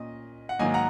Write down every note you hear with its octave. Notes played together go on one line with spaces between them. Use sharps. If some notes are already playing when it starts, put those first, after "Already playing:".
Already playing: A#2 C#4 D#5
F#5
G#2 D#3 F#3 A#3 D#5 G#5
F#5 A#5